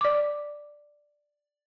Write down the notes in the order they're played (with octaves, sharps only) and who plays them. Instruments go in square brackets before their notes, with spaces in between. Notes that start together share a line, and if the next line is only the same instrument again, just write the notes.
[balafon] D5 D6